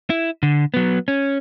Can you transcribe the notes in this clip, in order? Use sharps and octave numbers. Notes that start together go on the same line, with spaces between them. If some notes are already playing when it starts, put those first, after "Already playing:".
E4
D3
F#3 B3
C#4